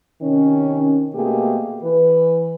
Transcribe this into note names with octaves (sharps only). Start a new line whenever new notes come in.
C3 D#3 C#4
B2 A3 A#3 G4 G#4
E3 B4